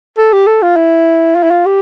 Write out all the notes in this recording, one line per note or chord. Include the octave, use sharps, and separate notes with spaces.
A4
G4
A4
F4
E4
F4
E4
F4
G4